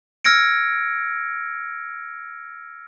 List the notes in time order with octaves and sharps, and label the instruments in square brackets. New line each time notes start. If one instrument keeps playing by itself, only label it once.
[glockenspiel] E6 F6 G#6 A#6 C#7 D7